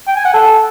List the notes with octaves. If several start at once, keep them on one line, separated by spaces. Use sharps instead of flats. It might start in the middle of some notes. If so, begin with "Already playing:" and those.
G5
G#5
F#5
A4